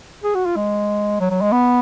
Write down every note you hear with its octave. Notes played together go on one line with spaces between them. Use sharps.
G#4
F#4
F4
G#3
F#3
F#3
G#3
B3